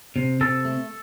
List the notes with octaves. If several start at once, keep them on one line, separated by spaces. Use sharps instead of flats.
C3
C3 A4
A3